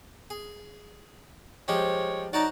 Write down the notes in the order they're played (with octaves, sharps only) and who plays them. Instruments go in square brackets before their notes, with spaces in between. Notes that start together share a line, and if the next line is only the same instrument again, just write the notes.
[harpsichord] G#4
[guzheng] F3 [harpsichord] G3 G#3 G4 [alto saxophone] C#5
[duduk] D#4 [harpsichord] F#4 C#5 A5 [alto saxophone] D5